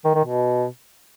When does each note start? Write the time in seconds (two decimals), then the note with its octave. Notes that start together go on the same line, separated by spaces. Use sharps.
0.05 D#3
0.15 D#3
0.25 B2